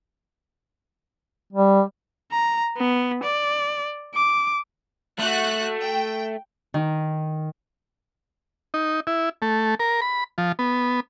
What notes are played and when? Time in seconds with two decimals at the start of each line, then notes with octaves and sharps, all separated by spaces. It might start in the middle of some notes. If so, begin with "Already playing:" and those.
1.53 G3
2.32 A#5
2.77 B3
3.23 D5
4.15 D6
5.19 A3 F#4 F#6
5.82 G5
6.74 D#3
8.74 D#4
9.07 E4
9.42 A3
9.80 A#4
10.02 B5
10.38 F3
10.59 B3